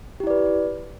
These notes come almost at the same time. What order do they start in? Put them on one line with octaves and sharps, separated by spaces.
G4 E4 D5 B4